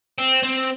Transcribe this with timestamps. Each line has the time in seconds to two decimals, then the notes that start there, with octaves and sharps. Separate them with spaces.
0.18 C4
0.43 C4